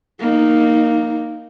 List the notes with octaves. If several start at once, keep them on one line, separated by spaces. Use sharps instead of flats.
A#3 D#4